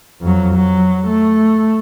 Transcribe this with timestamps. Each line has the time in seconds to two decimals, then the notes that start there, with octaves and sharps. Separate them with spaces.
0.22 F2 F#3
0.55 F#3
1.07 A3